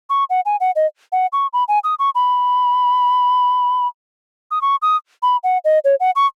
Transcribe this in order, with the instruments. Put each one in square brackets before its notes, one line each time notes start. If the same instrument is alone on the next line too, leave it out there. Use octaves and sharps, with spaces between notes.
[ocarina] C#6
F#5
G#5
F#5
D#5
F#5
C#6
B5
G#5
D#6
C#6
B5
D#6
C#6
D#6
B5
F#5
D#5
C#5
F#5
C#6